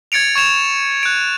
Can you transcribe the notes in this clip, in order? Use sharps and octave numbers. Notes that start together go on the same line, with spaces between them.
G#6 A6 C#7 D7 F7
C#6 G#6 E7 F7
F#6 D7